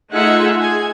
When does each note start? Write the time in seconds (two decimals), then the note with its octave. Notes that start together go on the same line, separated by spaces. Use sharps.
0.12 A3 D#4 F4 G#4 E5 F#5
0.60 G#4 G#5